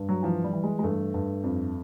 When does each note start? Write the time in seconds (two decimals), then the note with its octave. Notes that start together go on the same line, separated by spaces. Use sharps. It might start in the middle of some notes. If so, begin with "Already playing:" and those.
Already playing: G2
0.09 F#3
0.23 E3 F3
0.44 G3
0.53 E3
0.64 G#3
0.79 G#3
0.83 G2 A3
1.14 G2
1.44 F2